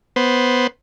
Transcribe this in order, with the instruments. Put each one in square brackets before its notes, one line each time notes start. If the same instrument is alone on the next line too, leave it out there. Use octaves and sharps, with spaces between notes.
[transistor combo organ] B3 C5